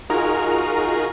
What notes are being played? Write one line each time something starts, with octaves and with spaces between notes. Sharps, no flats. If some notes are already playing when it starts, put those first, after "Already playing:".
D#4 F4 F#4 G#4 A#4 A#5